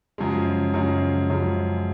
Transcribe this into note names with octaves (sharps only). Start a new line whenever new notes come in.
F#2 C#3 F3 G#3
F#2 C#3 F3 G#3
F#2 C#3 F3 G#3